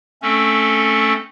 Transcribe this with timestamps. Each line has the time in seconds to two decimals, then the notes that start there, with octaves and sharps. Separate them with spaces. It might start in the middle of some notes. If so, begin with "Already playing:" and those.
0.22 A3 C4 C#4 A4